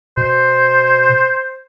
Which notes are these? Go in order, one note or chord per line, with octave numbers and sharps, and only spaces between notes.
B2 C5